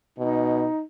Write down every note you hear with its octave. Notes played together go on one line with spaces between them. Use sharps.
B2 D#4